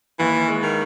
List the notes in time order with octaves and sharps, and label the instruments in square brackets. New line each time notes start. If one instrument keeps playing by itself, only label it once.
[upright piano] D#2 [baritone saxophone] E3
[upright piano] G#3
[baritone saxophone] D#3